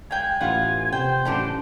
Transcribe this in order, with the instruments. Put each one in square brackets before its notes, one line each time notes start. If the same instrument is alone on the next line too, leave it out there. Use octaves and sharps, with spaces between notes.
[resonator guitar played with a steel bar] G#3 [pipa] F5 G5 [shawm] G#5
[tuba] A1 [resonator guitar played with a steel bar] B3 F4 [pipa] F#5
[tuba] C3 [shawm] C5 [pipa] G5
[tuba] A1 [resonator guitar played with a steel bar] C#3 D4 [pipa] E3 C#4 F#4